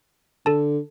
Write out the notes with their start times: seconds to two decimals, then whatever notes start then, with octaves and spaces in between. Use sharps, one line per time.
0.46 D3 A4 A5